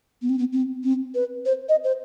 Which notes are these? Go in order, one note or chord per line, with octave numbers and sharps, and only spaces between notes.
B3
C4
B3
C4
C4
B4
C5
D#5
C5